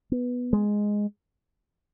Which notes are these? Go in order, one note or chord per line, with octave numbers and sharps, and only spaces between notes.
B3
G#3